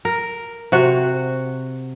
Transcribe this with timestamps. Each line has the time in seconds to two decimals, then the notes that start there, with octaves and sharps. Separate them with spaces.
0.05 A#4
0.72 C3 F#4